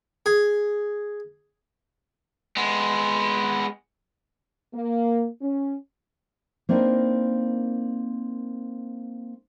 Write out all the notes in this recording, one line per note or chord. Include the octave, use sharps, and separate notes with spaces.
G#4
G#3 B3
A#3
C#4
A#3 C4 D4 D#4 A#4 B4